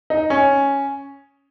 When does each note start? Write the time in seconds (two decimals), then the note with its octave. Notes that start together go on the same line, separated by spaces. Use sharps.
0.10 D#4
0.30 C#4